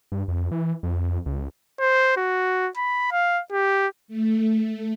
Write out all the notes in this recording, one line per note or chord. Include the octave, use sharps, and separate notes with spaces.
G2
F2
E3
F2
C#2
C5
F#4
B5
F5
G4
A3